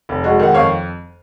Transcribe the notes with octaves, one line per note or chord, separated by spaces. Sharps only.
F1
G#3 F#4
D#3 F#5
F2 C#5 F5